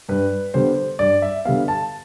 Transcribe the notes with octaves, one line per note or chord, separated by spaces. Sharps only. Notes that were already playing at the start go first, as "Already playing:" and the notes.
G2 B4
D3 G3 B3 C5
G2 D5
E5
D3 G3 B3 F5
A5